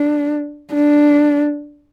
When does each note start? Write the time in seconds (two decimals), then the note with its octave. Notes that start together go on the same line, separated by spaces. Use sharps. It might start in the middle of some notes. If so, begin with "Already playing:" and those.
Already playing: D4
0.74 D4